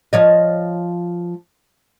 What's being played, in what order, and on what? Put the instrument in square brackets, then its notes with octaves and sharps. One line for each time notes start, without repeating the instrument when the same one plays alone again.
[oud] F3 C#5 D#5